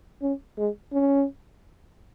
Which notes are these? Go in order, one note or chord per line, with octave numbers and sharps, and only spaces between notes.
C#4
G#3
C#4